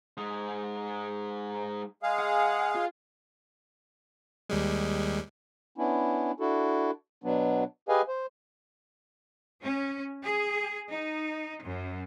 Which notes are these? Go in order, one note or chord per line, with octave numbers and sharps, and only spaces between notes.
G#3 D#4
G#3 G#4 F5
F#5
F4
D#2 G3 G#3
B3 C#4 D4 E4
D4 E4 F#4 A4
B2 F#3 B3 D4
G4 G#4 B4 D#5 F5 G#5
C5
C#4
G#4
D#4
F#2